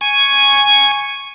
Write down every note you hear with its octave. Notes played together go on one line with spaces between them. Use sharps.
G#5 C#6